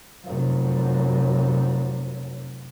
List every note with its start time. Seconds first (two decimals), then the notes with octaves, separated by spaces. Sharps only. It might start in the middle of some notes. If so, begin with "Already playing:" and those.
0.25 F1 F#2